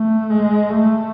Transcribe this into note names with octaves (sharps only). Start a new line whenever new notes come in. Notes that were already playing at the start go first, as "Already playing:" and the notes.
Already playing: A3
G#3
A3